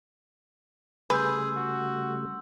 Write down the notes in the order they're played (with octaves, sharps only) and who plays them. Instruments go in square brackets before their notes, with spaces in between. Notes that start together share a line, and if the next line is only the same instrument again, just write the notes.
[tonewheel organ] C#3 G3 A3 [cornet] G#4 [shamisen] B4 [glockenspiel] C6 E6 G6
[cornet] F#4